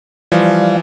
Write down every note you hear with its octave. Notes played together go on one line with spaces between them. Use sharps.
E3 F3 G3 D5 F5